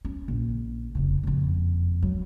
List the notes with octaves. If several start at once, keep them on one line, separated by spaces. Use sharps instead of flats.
C#4
A#1
F1 C#3
F#1 F2
F#3